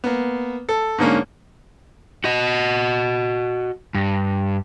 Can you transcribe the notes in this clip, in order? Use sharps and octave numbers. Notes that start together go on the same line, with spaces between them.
A#3 B3
A4
G#2 D3 A#3 C#4
F#4 D#5
G2